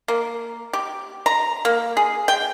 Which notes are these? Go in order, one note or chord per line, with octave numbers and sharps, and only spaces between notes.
A#3
G4
A#5
A#3
G#4
G5